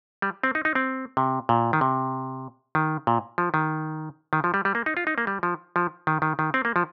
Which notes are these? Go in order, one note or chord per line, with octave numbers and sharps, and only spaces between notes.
G3
C4
D#4
D#4
C4
C3
A#2
D#3
C3
D#3
A#2
F3
D#3
D#3
F3
G3
G3
A#3
D#4
F4
D#4
A#3
G3
F3
F3
D#3
D#3
D#3
C4
A#3
F3